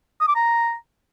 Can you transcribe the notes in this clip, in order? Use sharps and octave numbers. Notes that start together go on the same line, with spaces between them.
D#6
D6
A#5